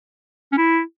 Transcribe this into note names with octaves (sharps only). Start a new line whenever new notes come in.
C#4
E4